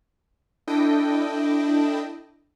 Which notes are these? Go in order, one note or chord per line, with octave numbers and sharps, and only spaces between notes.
D4 E4 A4 D#5 G5